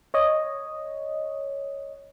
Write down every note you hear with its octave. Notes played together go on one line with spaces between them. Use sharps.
C#5 D#5